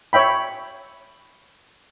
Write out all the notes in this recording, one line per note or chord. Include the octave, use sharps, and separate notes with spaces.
C#5 E5 G5 B5